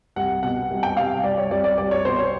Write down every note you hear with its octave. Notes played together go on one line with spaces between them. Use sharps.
C2 F#5
B2 F#5
C2
G5
C2 F5
G3 D5
C#5
C2 D5
D5
C2 D5
C#5
B2 C5
C#5